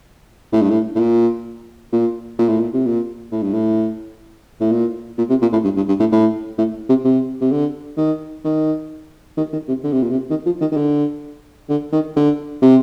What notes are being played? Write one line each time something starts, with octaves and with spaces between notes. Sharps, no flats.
A2
G2
A2
A2
A#2
A#2
A#2
A2
A#2
C3
A#2
A2
G2
A2
A2
A#2
A#2
C3
A#2
A2
G2
G2
G2
A2
A2
A2
C3
C3
C3
D3
D#3
D#3
D#3
D#3
C3
D3
C3
A#2
C3
D#3
F3
D#3
D#3
D3
D3
D#3
D3
C3